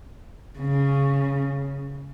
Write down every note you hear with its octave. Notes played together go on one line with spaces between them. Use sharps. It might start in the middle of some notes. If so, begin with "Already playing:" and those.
C#3